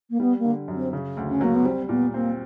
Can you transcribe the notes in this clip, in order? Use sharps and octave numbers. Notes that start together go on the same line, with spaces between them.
A#3
G3 B3
A#3
D3
F#2
C4
C#3
D2
C#4
F#3 A#3
B3
G3 C4
A#2 B3
A#3 C4